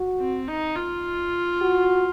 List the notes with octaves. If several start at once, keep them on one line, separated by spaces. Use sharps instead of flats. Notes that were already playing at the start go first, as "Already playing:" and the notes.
Already playing: F#4
C4
D#4
F4
F#4